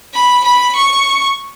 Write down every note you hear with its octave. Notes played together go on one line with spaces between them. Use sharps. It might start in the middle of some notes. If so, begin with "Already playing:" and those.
B5
B5
C#6